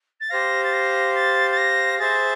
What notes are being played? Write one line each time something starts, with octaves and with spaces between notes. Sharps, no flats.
A6
G4 C5 F5 A#6
A6
A#6
A6
A6
A#6
G#4 C5 E5 A6